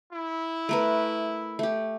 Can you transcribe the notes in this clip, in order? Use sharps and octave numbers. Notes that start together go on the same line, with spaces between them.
E4
A3 A#4 B4
A3 G4